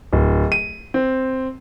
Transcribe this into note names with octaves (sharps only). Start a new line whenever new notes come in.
D1
D#7
C4